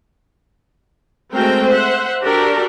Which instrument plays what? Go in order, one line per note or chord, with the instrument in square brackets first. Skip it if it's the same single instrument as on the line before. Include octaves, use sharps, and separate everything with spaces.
[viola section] G#3 A3 C4 F#4 A#4 G5
C5 E5 F#5
D4 F#4 G4 A4 A#4 D5